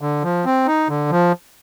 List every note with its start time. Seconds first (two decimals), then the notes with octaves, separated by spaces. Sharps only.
0.01 D3
0.23 F3
0.45 C4
0.66 D#4
0.89 D3
1.11 F3